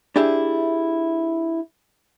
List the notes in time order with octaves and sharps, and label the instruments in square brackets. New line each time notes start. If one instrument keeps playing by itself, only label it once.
[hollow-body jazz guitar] D4 E4 G4 G#4 E5